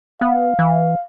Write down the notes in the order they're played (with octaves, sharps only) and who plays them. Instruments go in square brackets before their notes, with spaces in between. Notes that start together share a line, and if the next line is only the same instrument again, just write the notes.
[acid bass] B3 [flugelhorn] F5
[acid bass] E3